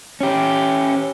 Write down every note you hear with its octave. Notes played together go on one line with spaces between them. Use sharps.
C#4 G4